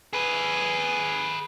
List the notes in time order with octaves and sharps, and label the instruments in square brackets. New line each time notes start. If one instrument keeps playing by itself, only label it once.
[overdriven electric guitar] G#4 B4